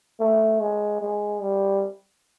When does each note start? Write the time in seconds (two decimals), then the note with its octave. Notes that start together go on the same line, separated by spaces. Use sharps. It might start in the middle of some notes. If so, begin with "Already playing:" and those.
0.20 A3
0.60 G#3
1.01 G#3
1.41 G3